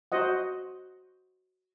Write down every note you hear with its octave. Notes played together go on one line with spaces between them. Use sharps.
F#4 C5 D#5 F#5